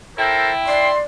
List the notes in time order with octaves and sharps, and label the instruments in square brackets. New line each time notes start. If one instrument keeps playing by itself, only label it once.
[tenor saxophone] E4 [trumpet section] A4 A#4 C5 [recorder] G5
[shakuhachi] D5 [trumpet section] C6